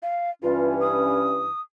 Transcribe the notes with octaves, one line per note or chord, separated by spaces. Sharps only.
F5
G2 E3 C#4 F4
D#6